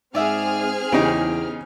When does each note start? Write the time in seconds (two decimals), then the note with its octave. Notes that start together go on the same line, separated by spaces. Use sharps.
0.15 G#2 C4 G#4 D5 E5 F#5 F6
0.92 E2 C#3 D#4 G4